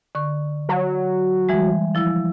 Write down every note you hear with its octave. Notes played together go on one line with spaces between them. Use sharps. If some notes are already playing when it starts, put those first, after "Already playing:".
D3 C#6
F#3
E3 G3 G#3
F3 E4